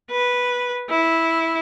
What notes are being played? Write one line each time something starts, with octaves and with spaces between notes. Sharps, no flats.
B4
E4